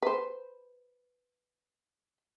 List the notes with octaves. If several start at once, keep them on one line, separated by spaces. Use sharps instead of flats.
B4 C5